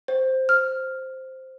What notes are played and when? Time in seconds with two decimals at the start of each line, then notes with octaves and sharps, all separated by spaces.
0.08 C5
0.49 F6